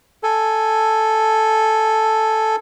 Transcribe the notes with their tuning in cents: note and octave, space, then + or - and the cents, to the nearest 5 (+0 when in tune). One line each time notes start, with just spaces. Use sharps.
A4 +0 G#5 +0